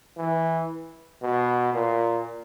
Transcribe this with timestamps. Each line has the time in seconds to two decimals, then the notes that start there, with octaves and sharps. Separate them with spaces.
0.17 E3
1.22 B2
1.74 A#2